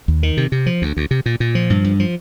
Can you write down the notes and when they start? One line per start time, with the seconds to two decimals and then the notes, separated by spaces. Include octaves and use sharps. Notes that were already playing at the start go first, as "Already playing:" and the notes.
0.08 D#2
0.23 D#3
0.37 C3
0.52 C3
0.66 F3
0.82 D2
0.97 D2
1.11 C3
1.26 A#2
1.40 A#2
1.55 F3
1.70 G2
1.84 G2
2.00 F3